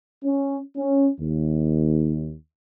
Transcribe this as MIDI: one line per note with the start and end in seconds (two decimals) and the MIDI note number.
0.24 0.57 61
0.77 1.06 61
1.21 2.32 39